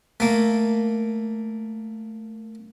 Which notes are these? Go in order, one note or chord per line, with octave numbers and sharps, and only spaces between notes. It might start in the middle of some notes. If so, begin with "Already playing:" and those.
A3 A#3